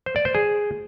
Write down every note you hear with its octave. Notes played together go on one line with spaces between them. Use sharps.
C5
D5
C5
G#4